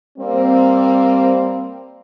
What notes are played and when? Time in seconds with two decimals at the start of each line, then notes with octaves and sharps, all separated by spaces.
0.18 G3 A#3 C4